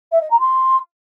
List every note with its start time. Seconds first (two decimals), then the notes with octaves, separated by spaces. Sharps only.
0.12 E5
0.21 D#5
0.30 A#5
0.39 C6